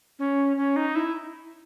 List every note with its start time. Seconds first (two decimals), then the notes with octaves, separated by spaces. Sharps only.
0.19 C#4
0.57 C#4
0.76 D#4
0.95 E4